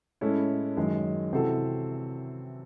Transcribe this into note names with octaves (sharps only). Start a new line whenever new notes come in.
A2 G#3 C#4 E4 A4
F#2 D#3 G#3
C3 E3 C4 F#4 A4